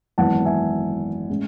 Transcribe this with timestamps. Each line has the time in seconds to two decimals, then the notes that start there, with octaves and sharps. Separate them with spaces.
0.18 G#1 F#2 E3 B3 F#5 A5
0.45 E5 G#5
1.30 A2 G#3 C#4